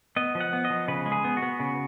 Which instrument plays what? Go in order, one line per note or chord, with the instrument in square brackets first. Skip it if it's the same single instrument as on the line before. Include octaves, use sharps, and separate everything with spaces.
[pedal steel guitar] B3 D#5
F3
F#5
B3
D#5
F3
C#3 B4
G#3
G#4
B3
F#4
B3
C#3